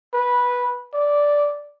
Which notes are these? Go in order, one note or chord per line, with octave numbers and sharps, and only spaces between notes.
B4
D5